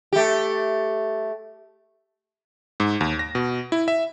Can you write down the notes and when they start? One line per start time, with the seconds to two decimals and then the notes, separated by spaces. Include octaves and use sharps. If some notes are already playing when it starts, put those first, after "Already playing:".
0.13 A3 G4
2.80 G#2
3.01 D#2
3.19 A#6
3.35 B2
3.72 E4
3.88 E5